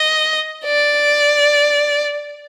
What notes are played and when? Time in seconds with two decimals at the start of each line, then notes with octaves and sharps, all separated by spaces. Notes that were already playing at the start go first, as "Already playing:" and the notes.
Already playing: D#5
0.65 D5